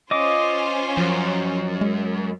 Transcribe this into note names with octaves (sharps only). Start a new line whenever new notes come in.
C#4 F4 C5 D#5 D6
F#2 F3
G#3